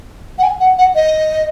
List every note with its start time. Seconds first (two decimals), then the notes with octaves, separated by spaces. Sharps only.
0.39 F#5
0.43 G#5
0.60 F#5
0.78 F#5
0.96 D#5